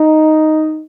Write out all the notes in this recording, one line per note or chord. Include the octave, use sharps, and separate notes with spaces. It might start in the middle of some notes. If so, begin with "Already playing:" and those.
Already playing: D#4